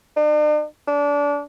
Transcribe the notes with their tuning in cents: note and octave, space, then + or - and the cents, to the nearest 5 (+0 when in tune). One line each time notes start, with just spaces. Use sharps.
D4 +45
D4 -25